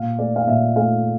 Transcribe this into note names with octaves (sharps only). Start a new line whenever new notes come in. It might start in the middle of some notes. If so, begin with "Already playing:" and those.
Already playing: A#2 F5
A3 D5
F5
A#2 E5
A3 F5